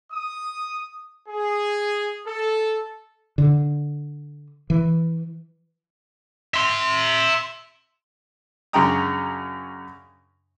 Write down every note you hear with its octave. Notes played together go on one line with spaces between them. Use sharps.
D#6
G#4
A4
D3
E3
E5 C6
F#2 C#3 D4 G5 A#5 D#6